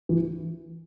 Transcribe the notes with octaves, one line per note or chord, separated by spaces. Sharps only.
E3